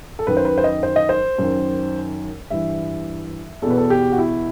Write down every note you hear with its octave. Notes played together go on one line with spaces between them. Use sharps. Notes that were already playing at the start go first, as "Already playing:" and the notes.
A4
F#2 D#3 B4
C5
B4
C5
D#5
C5
D#5
C5
F#2 D#3
G2 E3 E5
E2 B2 A4 B4
A4
G4
F#4
E4